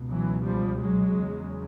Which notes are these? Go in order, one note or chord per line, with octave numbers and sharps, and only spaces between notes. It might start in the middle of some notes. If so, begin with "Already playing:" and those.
Already playing: C#2 B2
E3 F#3
F3 G3
F#3 G#3
E2 C#3